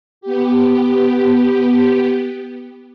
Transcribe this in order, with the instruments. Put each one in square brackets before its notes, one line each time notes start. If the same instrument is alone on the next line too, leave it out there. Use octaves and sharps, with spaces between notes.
[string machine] B3 G4